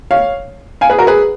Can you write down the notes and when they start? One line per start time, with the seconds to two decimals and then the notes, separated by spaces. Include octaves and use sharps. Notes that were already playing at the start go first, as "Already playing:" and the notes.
0.11 C#5 F5
0.81 F5 G#5
0.90 G#4 B4
0.98 F#4 A#4
1.07 G#4 B4